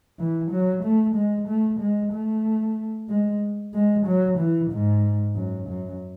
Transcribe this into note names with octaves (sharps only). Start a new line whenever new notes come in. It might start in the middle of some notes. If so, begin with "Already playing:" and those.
E3
F#3
A3
G#3
A3
G#3
A3
G#3
G#3
F#3
E3
G#2
F#2
F#2